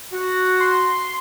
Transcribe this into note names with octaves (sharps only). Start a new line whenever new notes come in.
F#4
C6